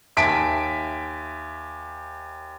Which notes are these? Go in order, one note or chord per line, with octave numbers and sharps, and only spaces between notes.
D#2 E5 G#5 A5 B6 D7